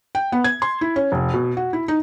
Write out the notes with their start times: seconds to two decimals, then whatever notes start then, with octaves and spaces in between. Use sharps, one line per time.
0.15 G5
0.32 B3
0.44 G#6
0.62 C6
0.81 E4
0.96 C#4
1.12 F1
1.34 B2
1.57 F#4
1.73 E4
1.88 D#4